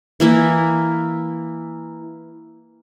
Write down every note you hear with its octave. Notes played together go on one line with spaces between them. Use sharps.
E3 A#3 E4